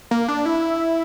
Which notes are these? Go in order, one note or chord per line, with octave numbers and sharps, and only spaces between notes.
A#3
D4
E4